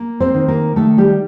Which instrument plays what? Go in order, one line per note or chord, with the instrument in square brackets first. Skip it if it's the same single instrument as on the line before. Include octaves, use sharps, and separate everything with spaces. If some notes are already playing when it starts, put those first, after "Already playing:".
Already playing: [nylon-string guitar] A#3
C4 C5
D#3
A#3 A#4
D#3 A3 A4
G3 G4